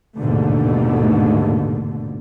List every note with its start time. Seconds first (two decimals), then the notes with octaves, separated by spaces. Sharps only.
0.16 A1 D#2 G#2 B2 D3 A3